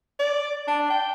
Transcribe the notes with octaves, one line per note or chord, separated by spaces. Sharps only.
D5
D4
G5